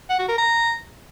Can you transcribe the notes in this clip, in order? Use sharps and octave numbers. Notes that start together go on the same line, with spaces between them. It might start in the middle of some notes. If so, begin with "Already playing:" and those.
F#5
F#4
A#4
A#5